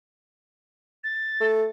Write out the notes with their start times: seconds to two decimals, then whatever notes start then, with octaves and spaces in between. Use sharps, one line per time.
1.04 A6
1.41 A3